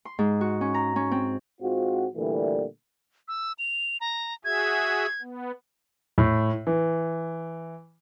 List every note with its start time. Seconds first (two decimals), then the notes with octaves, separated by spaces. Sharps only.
0.05 C6
0.19 G#2
0.41 F#4
0.61 C#4
0.74 A#5
0.96 C#4
1.11 C4
1.62 G#2 C4 F4 F#4
2.15 A#2 D3 E3 G3 A3
3.28 E6
3.59 F7
4.01 A#5
4.45 F#4 G#4 E5 G#6
5.21 B3
6.18 A2
6.67 E3